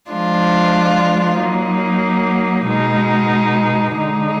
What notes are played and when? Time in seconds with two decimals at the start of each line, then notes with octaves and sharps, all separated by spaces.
0.10 F3 G#3 D4 F4
1.37 F#3 A#3 D#4
2.66 B2 G#3 D#4
3.94 D3 G#3 D#4